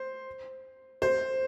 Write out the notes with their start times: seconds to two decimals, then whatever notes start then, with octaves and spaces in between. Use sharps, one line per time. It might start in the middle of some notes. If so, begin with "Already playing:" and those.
Already playing: C5
1.02 C5